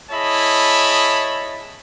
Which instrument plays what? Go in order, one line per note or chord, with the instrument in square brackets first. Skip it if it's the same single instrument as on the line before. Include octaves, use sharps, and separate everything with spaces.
[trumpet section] E4 G#4 C#5 D#5 A5 B5